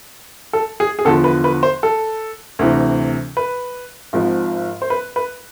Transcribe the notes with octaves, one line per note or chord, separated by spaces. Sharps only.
A4
G#4
G#4
E2 D3 F3 A4
B4
B4
C5
A4
D2 C3 E3
B4
G#1 G#2 F3
C5
B4
B4